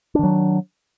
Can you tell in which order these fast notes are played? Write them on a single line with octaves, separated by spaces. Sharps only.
D4 D#3 F#3